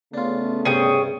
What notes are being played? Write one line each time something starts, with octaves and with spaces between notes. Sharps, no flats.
C#3 A3 B3 D4 F4
G2 C3 G#4 C#5 G5